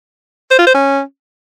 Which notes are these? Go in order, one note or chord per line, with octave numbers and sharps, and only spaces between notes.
C5
F4
C5
C#4